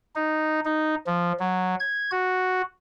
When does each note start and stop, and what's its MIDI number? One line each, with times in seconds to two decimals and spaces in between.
0.16 0.60 63
0.65 0.95 63
1.07 1.33 53
1.40 1.75 54
1.80 2.11 92
2.12 2.62 66